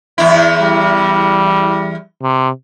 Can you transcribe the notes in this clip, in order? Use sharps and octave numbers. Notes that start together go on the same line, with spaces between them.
E2 E4
G3
C3